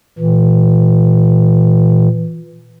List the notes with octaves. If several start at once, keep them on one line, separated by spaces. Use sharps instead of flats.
A#2 E3